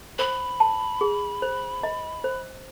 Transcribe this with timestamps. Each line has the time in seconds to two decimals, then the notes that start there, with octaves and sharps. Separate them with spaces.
0.19 C5 B5
0.60 A5
1.01 G#4
1.42 C5
1.83 D#5
2.24 C5